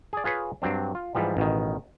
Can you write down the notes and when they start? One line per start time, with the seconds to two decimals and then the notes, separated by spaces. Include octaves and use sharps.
0.13 G#4 D5
0.24 F4 G#4 B4 C#5
0.62 G2 F#3 C4 D4
0.95 F4
1.15 G#2 E3 F3 G3
1.37 A1 B2 D#3